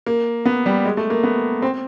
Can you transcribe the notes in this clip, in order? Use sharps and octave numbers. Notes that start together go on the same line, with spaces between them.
A#3
B3
G3
G#3
A3
A#3
B3
C4